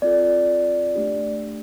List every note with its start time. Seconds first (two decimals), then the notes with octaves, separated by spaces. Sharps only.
0.02 C4 F4 A4 D5
0.95 A3 D4 G4